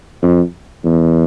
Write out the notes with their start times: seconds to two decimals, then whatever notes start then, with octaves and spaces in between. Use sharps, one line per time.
0.23 F2
0.85 E2